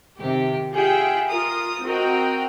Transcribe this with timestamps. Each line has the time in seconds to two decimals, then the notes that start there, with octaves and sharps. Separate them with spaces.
0.17 C3 D#3 G4
0.72 F4 G4 G#4 E5 F#5 G5
1.29 F4 A#4 D#6
1.84 C4 F#4 A#4 D#5 G5